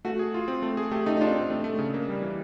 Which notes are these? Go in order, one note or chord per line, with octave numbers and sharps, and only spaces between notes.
A3 F#4
G#4
F4
C4
A3
G#4
A3 G4
A3 D#4
D#4
D4 F4
C4
A3
A3
C#3
A#3
G3
E3